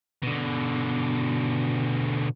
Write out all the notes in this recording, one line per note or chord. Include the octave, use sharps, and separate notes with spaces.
B2 D3